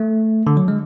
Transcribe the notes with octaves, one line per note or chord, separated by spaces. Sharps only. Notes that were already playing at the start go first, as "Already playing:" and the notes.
Already playing: A3
D3
F#3
G#3